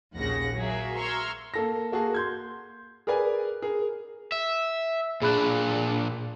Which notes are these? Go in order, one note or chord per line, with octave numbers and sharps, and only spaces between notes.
A#1 D#2 A#2 C#3 F#5 A#6
F#3 A#3 G#4 A#4 E5
A#5 C6 C#6 E6 F6 G#6
A#3 A4 A#6
A#3 F#4 G#4 A5
C6 G6 G#6
G#4 A#4 B4 D5 G#5
G#4 A#4
E5
A#2 D4 G#4 B5 F#6